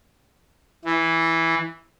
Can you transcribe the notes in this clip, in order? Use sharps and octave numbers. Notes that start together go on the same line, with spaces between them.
E3